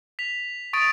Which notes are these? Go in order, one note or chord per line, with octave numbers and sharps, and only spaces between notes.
B6 F7
C#6 D#6 A6 D7